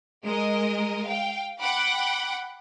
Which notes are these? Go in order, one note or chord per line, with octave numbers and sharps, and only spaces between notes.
G#3 A#4 D#5
F5 G5
F#5 G5 B5 D6 F#6